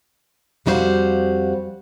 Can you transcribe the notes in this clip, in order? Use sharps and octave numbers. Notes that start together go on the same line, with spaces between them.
F2 G3 D#4 F#4 C5 F5